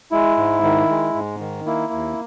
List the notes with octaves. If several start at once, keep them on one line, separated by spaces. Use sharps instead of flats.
G#3 E4
G#2
D#3
G#3
G#2
D#3
A#3 E4
D#2